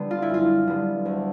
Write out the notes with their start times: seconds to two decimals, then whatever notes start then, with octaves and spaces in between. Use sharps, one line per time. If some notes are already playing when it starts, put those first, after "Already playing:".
Already playing: D3 G3 B3
0.11 F4
0.22 E4
0.30 F#2 F4
0.67 D3 G3 B3
1.05 D2